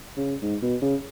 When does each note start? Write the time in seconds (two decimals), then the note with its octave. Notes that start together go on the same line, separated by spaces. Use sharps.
0.17 C#3
0.42 G#2
0.62 B2
0.82 C#3